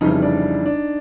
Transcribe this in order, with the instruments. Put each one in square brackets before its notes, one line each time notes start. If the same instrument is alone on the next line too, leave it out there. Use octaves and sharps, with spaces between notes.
[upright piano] F1 F2 C#3 E3 G3 [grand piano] D#4
[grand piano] D4
D4